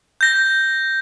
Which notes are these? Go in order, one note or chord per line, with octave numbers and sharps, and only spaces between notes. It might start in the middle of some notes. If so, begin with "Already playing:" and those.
G6 A#6